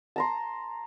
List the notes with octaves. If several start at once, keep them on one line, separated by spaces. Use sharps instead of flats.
A5 A#5 C6